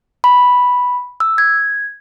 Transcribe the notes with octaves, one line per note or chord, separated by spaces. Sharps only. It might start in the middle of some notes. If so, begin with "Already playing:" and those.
B5
E6
G#6